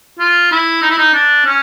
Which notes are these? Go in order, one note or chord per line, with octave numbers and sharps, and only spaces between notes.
F4
E4
D#4
E4
D#4
D4
C#4